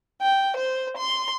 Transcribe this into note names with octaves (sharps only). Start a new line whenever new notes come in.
G5
C5
C6